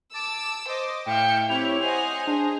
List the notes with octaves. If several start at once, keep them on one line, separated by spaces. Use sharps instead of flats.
A5 D6 E6 D7
C5 D#5 D6
A2 E5 F5 G5 C#7
C4 E4 G4 C#5 F7
C5 D#5 F#5 G#5
D4 G#4